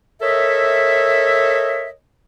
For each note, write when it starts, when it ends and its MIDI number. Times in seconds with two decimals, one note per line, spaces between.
0.21 1.90 69
0.21 1.90 70
0.21 1.90 73
0.21 1.90 75
0.21 1.90 76